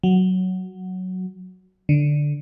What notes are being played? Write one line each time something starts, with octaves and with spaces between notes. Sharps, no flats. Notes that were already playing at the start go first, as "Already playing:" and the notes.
F#3
D3